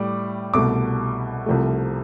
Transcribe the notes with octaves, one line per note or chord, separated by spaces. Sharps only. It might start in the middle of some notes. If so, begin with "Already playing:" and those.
Already playing: A2 G3 D6
C2 B2 A3 D6
C2 C3 F3 A3